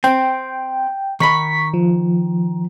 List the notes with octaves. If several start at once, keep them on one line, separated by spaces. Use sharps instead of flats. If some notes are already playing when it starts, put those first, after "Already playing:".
C4 G5
D#3 B5 C#6 B6
F3